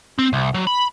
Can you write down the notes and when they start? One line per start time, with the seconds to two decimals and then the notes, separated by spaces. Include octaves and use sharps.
0.19 C4
0.33 C2
0.55 F#3
0.67 B5